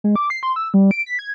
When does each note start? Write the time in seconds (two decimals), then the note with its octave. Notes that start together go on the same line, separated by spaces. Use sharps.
0.04 G#3
0.16 D6
0.30 C7
0.43 C6
0.56 E6
0.74 G3
0.91 D7
1.06 B6
1.19 G#6